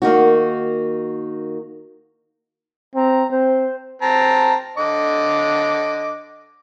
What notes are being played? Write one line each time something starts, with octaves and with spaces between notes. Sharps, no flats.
D#3 A#3 D#4 F#4
C4 A#5
C4 C5
C4 A5 A#5
D3 D#5 D6